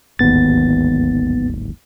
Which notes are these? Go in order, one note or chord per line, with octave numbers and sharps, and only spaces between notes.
D1 G#1 D#2 B3 A6